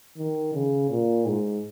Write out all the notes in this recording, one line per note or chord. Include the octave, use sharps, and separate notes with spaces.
D#3
C#3
A#2
G#2